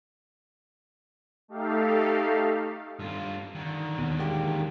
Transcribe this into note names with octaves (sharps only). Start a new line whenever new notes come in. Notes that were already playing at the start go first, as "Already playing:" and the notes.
A3 D#4 G4 A4 F5
G2 F4
D3 D#3
D#2 B2
G#3 A#3 G4